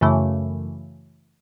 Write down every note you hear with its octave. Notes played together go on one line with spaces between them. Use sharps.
F#2 C#3 E3 A3